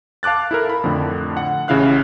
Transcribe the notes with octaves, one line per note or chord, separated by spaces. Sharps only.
F5 A5 D6 F#6 A6
E4 A4 A#4
B5
F2 A2 D3
F#5
A1 C#3 E4 F5 F#6